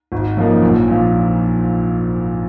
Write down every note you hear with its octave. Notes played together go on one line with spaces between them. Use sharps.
G#1
F#2 F3 A#3 D#4
A#1
A#2 F3